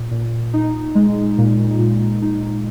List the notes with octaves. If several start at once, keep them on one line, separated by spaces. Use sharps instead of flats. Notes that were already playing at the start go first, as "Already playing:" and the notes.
Already playing: A#2
A#2
D#4
G#3
A#2
A#2
D#4